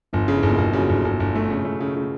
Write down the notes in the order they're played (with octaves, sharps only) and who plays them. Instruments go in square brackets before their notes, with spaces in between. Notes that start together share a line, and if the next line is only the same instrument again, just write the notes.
[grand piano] G1 [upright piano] F3
[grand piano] C#3
[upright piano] E3
[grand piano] G1 [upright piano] A#2
[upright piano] B2
[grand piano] G1
[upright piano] F#2 [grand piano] C#3
[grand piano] G1
G1
G1
A3
C#3
A3
C#3
C#3